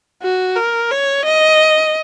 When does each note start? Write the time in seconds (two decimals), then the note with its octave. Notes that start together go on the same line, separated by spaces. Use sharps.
0.23 F#4
0.56 A#4
0.91 C#5
1.25 D#5